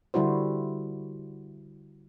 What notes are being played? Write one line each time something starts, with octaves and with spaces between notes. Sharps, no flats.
D3 G3 E4 F#4 C5